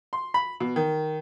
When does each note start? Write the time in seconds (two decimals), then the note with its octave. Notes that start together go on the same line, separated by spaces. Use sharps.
0.13 C6
0.34 B5
0.60 B2
0.76 D#3